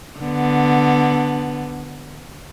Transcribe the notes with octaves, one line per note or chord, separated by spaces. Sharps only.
D3 B3